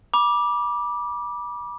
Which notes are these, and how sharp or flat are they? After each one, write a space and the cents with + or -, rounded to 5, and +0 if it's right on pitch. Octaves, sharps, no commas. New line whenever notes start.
B5 -30 D6 +0